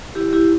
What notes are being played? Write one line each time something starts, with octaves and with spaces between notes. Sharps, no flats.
E4 G4
E4 G4